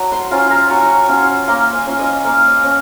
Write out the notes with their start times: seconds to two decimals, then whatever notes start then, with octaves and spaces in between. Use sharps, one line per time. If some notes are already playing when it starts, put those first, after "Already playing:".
Already playing: F#3
0.12 C6
0.31 C#4 F4 A#5
0.50 A#5
0.70 F#3 C#6
1.08 C#4 F4
1.48 A#3 C6
1.73 G#5
1.86 C#4 F4
1.99 D#5
2.24 A#3 F5
2.63 C#4